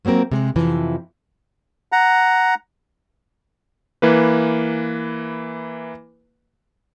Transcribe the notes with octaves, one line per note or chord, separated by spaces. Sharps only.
F3 F#3 A#3 C4 A#4
C3 G#3
F2 C3 E3 F3
F#5 A#5
E3 A#3 B4